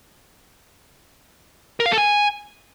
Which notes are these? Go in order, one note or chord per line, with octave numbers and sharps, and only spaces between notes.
A#4
F5
A4
G#5